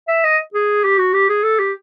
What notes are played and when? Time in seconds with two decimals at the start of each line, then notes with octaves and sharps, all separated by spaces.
0.08 E5
0.24 D#5
0.54 G#4
0.84 G4
0.98 F#4
1.14 G4
1.29 G#4
1.43 A4
1.59 G4